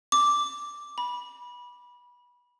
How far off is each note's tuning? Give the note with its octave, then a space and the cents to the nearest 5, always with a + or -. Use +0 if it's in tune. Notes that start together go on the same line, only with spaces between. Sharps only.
D6 -5
B5 -20